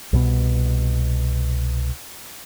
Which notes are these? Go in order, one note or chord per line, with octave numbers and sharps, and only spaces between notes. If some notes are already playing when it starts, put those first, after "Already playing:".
C2 B2 B3